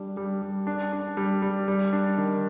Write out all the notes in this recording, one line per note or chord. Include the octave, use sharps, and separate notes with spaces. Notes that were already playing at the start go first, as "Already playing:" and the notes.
Already playing: G3 D4
G3
G3
D4
D4
G3
G3
G3
D4
D#3